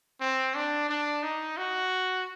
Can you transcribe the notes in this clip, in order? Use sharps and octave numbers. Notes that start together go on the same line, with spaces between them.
C4
D4
D4
D#4
F#4